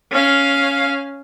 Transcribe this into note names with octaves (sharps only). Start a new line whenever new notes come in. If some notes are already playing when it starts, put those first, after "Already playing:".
C#4 F5